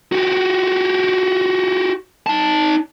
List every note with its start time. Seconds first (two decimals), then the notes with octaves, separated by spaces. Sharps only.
0.12 F#4 G4
2.27 D#4 A5